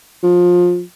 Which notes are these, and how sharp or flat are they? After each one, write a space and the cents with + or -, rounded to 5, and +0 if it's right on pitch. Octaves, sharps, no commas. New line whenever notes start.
F3 +25